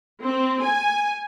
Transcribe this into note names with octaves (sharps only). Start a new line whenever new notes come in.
C4
G#5